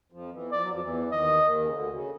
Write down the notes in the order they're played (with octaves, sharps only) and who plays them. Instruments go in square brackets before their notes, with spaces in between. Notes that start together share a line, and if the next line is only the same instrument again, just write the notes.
[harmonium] F2 F3
E2 E3
[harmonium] F3 [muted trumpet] D5
[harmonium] F#3
F2 F3
E2 E3
[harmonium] D#2 D#3 [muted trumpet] D#5
[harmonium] D#2 D#3
C#3
D2 D3
C#3